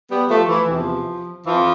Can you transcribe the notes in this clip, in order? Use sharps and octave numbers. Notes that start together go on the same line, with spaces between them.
G3 B3
F3 A3
E3
E2 C3 E3 F3
F2 E3 F3